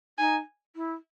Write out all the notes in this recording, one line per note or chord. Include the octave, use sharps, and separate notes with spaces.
D#4 G#5
E4